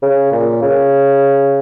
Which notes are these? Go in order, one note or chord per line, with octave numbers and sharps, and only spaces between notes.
C#3
A#2
C#3